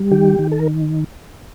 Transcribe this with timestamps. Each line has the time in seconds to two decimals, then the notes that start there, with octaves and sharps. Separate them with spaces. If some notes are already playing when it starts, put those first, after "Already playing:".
Already playing: G3
0.11 D#3 G4
0.39 D#3
0.52 A4
0.59 A#4